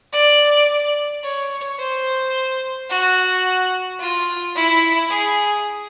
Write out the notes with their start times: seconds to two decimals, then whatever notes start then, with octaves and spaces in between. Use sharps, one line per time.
0.13 D5
1.23 C#5
1.79 C5
2.90 F#4
3.99 F4
4.55 E4
5.10 G#4